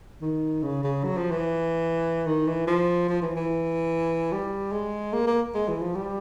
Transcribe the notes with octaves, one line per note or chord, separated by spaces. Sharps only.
D#3
C#3
C#3
F#3
F3
E3
D#3
E3
F3
F3
E3
E3
G3
G#3
A#3
A#3
G#3
E3
F3
G3